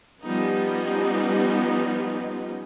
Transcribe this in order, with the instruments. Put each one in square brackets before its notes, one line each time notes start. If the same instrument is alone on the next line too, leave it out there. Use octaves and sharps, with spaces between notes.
[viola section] F3 G3 B3 C#4 D#4